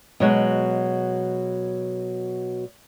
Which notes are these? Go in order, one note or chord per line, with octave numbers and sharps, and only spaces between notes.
B2 F#3 G#3 F#4